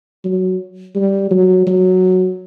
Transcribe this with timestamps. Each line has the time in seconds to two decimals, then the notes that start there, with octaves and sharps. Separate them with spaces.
0.24 F#3
0.96 G3
1.31 F#3
1.67 F#3